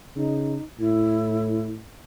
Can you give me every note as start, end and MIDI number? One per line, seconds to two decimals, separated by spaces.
0.15 0.56 49
0.15 0.62 63
0.80 1.81 45
0.80 1.69 64